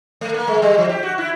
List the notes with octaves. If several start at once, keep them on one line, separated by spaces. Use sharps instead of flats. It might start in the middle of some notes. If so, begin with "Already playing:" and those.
A3
A#3
G#3
G3
F3
G4
F#4
E4